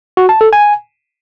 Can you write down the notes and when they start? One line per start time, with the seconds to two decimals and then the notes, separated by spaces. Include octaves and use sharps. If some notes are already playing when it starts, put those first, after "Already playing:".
0.17 F#4
0.29 A5
0.41 A4
0.53 G#5